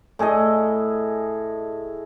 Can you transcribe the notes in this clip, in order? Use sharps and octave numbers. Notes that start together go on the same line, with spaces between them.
A2 G#4 A4 D#5